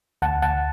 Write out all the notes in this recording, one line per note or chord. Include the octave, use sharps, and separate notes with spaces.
D2 F#5 A5
D2 F#5 A5